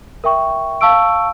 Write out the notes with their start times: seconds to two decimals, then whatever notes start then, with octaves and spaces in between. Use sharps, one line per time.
0.24 A#4 E5 G5 C#6
0.81 F5 A5 C#6 E6 D7